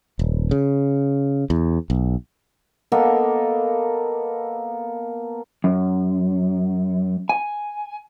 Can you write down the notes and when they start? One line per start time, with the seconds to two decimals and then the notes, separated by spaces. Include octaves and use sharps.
0.19 D#1
0.51 C#3
1.50 E2
1.90 B1
2.92 A#3 B3 A4 D#5
5.64 F#2
7.29 G#5